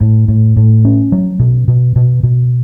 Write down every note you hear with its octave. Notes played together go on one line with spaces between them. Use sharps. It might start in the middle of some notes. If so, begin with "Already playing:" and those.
A2
A2
A2
C#4
F#3
B2
B2
B2
B2